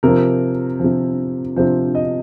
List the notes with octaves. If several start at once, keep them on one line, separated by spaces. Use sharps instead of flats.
C3 F3 A#4
C3 F3
C3 F3 C5
D#5